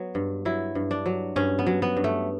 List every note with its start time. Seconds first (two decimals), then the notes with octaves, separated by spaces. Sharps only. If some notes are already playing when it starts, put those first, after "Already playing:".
Already playing: F#3 B3
0.15 G2
0.45 F#3 E4
0.75 G2
0.91 D4
1.06 F#3
1.36 G2 C#4
1.59 B3
1.66 F#3
1.82 B3
1.97 G2
2.04 A3